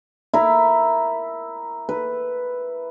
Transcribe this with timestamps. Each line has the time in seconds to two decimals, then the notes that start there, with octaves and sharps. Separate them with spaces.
0.34 E4 A#4
1.89 B4